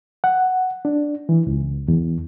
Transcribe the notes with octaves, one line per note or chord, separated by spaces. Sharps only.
F#5
D4
E3
C#2
E2